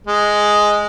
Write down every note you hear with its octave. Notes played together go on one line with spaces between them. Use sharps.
G#3